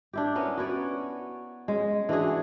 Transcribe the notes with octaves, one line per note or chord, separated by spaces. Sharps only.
D4 E4 G4
B3 C#4 A#4
F#4 B4 C#5 D5
G#3 C#4
E3 D4 F#4 G#4